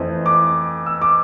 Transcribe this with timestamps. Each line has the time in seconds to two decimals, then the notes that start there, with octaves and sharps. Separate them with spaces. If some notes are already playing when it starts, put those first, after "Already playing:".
Already playing: F2 E3 A3 C4
0.26 D6
0.86 E6
1.02 D6